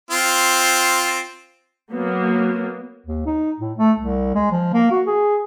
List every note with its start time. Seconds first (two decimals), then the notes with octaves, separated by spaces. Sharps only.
0.11 C4 F4
1.92 F#3 A#3 B3
3.07 D#2
3.26 D#4
3.60 A2
3.78 A3
3.99 C2
4.35 G#3
4.52 F3
4.74 A#3
4.91 F#4
5.06 G#4